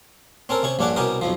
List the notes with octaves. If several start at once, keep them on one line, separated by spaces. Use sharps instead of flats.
C4 C#4 A4 A#4
C3 C#4 C#6
A#1 G2 C#4 D4 F#5 D6
C2 B2 C#4 G4 A#4 D#6
B1 F2 F3